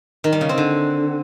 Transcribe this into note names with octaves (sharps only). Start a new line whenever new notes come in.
D#3
G3
C#3
C4
D3